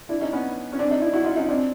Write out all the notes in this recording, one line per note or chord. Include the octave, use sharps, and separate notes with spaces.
D4 E4
C#4 D#4
B3 C#4
C#4
C4 D4
C#4 D#4
D4 E4
E4 F#4
D#4 F4
C#4 D#4
C4 D4